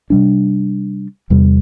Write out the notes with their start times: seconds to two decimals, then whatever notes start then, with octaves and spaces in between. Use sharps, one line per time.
0.10 C3 G3 D4
1.30 E2 C3 G3